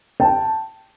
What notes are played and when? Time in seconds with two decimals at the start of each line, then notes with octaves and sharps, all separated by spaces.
0.20 G5 A5